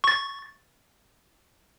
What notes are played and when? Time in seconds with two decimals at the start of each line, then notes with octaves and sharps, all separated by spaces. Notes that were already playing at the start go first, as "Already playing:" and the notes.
0.04 C#6 A6